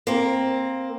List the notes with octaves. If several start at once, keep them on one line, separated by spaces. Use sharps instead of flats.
A#3 C4